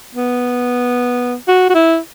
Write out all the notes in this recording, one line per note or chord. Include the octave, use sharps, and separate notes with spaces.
B3
F#4
F#4
E4